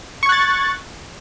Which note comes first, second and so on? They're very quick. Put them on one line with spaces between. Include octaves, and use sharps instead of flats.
C#6 G#6 F#6 A6